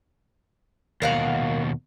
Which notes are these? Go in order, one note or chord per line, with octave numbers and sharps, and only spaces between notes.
D#2 B2 A#4 F5 F#5